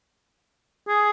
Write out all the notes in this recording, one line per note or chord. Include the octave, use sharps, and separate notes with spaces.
G#4